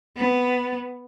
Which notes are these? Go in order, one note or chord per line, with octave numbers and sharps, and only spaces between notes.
B3